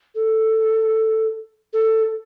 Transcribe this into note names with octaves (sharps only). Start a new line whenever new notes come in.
A4
A4